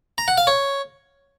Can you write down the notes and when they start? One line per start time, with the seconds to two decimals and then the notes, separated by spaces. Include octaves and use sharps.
0.18 A#5
0.28 F#5
0.37 F5
0.47 C#5